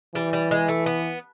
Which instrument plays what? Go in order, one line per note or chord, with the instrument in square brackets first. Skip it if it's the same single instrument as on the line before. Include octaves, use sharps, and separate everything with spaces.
[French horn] E3 [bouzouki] G3
[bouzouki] G3
G#3
A3
B3